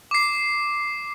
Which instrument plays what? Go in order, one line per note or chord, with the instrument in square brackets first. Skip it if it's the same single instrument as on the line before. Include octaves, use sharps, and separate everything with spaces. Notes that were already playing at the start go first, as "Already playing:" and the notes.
[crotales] D6 C7